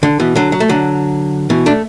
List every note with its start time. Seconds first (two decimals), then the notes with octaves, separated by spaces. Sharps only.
0.03 D3
0.20 B2 E3
0.36 D3 F#3
0.52 F#3
0.60 A3
0.69 D3 F#3
1.50 B2 E3
1.66 A3 D4